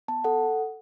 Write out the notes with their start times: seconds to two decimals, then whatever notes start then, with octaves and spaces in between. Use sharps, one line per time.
0.08 B3 A5
0.24 A4 F#5